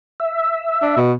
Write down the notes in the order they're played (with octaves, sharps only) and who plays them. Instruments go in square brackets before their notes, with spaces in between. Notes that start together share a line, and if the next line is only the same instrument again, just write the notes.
[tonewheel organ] E5
[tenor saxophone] D4
B2